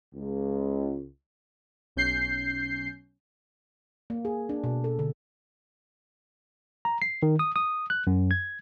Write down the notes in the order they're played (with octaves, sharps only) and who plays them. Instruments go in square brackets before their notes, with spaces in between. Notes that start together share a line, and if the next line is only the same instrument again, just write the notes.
[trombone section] C#2
[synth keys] B1 C#4 G6 C7
[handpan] A#3
G#4
D4
B2
A4
D3
[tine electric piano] A#5
C7
D#3
D#6
D#6
F#6
F#2
G#6